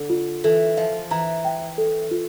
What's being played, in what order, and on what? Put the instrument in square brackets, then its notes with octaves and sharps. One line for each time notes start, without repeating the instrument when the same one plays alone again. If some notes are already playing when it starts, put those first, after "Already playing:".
Already playing: [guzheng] D3
[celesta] F4
[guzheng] E3 [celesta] A4
[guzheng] F3 [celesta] E5
[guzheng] E3 [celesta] A#5
[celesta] G5
A4
F4